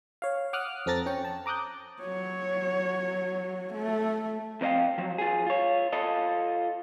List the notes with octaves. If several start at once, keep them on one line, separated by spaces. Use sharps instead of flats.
C#5 F5
F#5 D6 D#6 F6 F#6
F2 C4 A4 A#5 A6 A#6
C#4 G5 C#6
A5
A#5 D6 D#6 F#6 G6
F#3 C#5
A3
F2 C4 D#5 F5 G5
F3 F#3
F4 G#4
F4 C#5
F4 A4 D#5